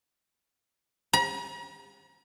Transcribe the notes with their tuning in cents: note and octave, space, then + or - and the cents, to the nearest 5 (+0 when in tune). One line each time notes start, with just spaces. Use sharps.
A#5 +45